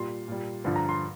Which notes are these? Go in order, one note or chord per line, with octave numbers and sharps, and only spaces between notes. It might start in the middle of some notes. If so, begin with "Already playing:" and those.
Already playing: A#2 G3 C6
A#2 G3
G2 D3 F3
A#5
C6